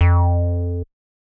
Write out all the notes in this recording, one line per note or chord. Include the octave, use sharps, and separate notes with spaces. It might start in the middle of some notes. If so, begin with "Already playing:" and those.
F2